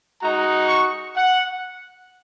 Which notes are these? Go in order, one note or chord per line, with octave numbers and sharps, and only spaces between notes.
G#3 D#4 F#4 A#5
C#6
F#5